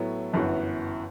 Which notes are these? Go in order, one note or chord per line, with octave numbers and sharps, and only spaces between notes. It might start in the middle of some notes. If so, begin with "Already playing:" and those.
Already playing: A2 F#3 B3 E4 A4
G1 F#2 E3 B3 F#4